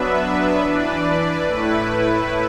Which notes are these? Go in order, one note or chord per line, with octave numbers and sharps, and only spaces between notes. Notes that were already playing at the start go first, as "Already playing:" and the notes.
Already playing: F#3 B3 D4 B4 E5
E3 D4 B4 D5
A2 A3 E4 B4